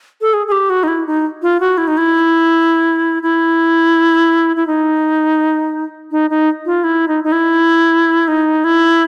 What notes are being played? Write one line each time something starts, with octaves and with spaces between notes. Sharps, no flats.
A4
G#4
G#4
G4
F#4
D#4
E4
D#4
F4
F#4
E4
D#4
E4
E4
E4
D#4
D#4
D#4
F4
E4
D#4
D#4
E4
D#4
E4